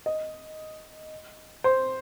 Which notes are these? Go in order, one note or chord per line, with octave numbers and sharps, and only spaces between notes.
D#5
C5